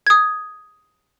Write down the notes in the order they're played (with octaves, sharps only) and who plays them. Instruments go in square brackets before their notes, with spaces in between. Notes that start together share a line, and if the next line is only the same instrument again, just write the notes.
[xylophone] D#6 G#6